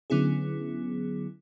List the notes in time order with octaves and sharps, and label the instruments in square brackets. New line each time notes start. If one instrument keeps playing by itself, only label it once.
[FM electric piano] D3 F#3 B3 C#4 E4 G#4